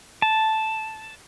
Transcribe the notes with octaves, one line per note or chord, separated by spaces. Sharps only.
A5